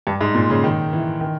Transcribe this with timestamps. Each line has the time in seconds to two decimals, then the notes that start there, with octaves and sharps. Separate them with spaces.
0.07 G2
0.21 G#2
0.35 A#2
0.50 C#3
0.64 D#3
0.93 E3
1.21 D#3